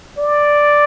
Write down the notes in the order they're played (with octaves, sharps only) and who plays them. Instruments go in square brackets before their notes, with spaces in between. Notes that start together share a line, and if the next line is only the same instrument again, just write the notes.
[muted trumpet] D5